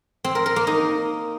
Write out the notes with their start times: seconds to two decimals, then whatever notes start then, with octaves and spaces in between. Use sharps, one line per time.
0.24 C4
0.35 A#4
0.46 A#4
0.56 A#3
0.67 D#4